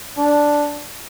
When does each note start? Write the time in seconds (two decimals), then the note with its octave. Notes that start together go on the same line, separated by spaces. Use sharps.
0.17 D4